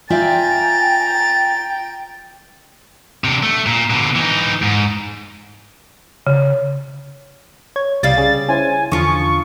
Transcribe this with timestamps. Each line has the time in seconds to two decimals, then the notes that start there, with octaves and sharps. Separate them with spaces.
0.10 F4 D5 E5 G5 G#5 A#5 A6
3.24 C3 D4
3.43 A3
3.66 A#2
3.90 B2 D3
4.16 E3 D#4
4.62 G#2
6.27 C#3
7.76 C#5 G#6
8.03 C2 C#3 G3 F5 A6
8.18 C#4 G#4
8.49 C#4 E4 C5 G#5
8.92 E2 D3 F3 F4 C#6